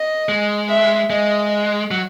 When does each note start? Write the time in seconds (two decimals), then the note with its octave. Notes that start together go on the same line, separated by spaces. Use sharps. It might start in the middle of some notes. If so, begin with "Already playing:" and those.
Already playing: D#5
0.29 G#3
0.68 E5
1.10 G#3 D#5
1.91 F#3